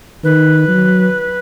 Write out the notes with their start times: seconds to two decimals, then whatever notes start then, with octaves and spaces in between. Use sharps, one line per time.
0.24 D#3 B4
0.68 F#3